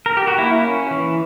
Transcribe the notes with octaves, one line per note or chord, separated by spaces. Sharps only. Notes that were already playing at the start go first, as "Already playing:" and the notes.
A#4
G4
F#4
A#3 E4
C#4
E3